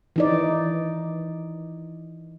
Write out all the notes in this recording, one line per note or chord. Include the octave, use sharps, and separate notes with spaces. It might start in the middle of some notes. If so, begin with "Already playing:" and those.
E3 D#4 D5